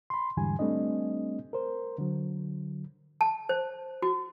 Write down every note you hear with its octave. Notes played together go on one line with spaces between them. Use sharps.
B5 C6
E2 G#2 D3 E3 G3 G#5
G3 A3 C4 D4 D#5
A#4 C5
D3 F#3
A5
C5
F#4